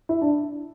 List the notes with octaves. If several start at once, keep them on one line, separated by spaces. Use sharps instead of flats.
E4
D4